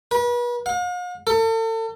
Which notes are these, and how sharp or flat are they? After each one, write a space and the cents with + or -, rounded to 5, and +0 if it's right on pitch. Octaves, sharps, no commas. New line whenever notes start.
B4 -35
F5 +45
A4 +40